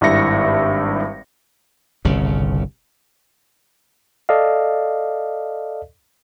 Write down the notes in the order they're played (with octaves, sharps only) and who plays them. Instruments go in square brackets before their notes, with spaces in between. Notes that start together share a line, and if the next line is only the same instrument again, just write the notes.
[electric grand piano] G#1 G2 E4 E5 A#6 C#7
[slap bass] G1 C2 C#3
[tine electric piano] A4 D5 D#5 F5